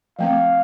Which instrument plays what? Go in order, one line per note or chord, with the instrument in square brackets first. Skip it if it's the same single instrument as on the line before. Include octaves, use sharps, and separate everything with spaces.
[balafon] F3 A3 C4 [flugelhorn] F5